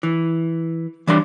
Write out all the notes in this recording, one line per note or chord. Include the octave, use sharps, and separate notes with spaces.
E3
E3 G3 D4 C6